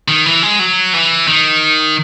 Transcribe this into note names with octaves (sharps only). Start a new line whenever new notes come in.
D#3
E3
G#3
F#3
E3
D#3